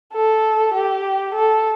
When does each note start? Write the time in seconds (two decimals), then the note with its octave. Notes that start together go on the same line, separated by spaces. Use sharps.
0.14 A4
0.74 G4
1.35 A4